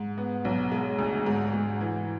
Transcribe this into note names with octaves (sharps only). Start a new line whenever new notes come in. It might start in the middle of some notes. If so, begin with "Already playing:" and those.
Already playing: G#2
B3
B1
G#3
D2
G#2
G#2
E3